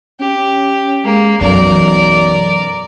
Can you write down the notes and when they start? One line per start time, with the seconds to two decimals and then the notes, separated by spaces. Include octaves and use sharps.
0.20 C#4 G4
1.05 G#3 A#3
1.41 B1 F#2 E3 A#4 D5